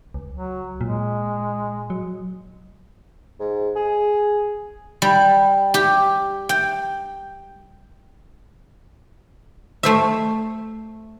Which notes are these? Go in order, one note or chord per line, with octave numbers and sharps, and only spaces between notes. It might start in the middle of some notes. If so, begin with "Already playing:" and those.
C#2
F#3
A#2 G#3
F#3
G#2
G#4
G3
G4
G5
A3 C5 E5